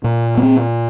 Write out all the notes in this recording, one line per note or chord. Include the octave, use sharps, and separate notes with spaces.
A#2
B3
C4